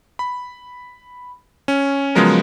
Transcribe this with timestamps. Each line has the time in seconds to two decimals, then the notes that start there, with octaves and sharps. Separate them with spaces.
0.19 B5
1.68 C#4
2.15 C#3 F3 F#3 G#3 B3 A#4